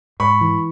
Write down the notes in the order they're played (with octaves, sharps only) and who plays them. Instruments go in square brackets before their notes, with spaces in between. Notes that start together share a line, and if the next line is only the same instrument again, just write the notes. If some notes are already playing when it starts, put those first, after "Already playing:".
[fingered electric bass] G#2 [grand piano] B5 C#6
[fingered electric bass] E3